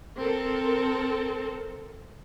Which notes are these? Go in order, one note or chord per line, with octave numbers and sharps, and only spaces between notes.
C4 A4 A#4